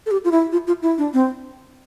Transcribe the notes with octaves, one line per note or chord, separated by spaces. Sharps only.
A4
G4
F4
E4
F4
F4
E4
D4
C4